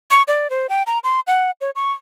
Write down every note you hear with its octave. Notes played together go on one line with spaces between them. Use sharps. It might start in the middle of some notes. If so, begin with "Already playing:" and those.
C#6
D5
C5
G5
A#5
C6
F#5
C#5
C#6